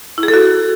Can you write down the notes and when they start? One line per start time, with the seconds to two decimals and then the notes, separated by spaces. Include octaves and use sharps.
0.18 E4
0.23 G#4
0.28 A4
0.34 F#4